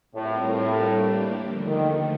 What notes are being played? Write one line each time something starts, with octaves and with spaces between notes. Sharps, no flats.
A2 G3 C4 F4 A#4
A2
G3 A#3 D4 G4
D#2 D3 F3 A3
D#3